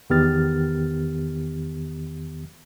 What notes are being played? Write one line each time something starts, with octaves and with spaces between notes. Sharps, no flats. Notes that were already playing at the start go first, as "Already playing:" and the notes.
E2 D#3 B3 G4 F6 A6